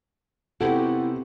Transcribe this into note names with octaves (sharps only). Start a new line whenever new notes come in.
C3 B3 D#4 E4 F#4 G4 A4